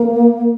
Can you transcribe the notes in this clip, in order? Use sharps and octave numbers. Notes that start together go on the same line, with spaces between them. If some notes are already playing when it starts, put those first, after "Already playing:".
Already playing: A#3